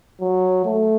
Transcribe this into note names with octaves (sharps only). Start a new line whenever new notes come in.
F#3
A3